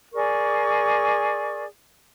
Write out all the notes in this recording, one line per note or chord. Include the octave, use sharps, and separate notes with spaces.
G#4 A#4 D5 C#6